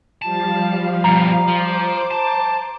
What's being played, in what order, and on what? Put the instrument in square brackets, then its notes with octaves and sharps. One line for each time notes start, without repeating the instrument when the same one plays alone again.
[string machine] F3 G3 F5 [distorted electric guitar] A5
[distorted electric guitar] G2 B2 [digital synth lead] A#5
[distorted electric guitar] F3 [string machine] C5 D6
[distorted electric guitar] A5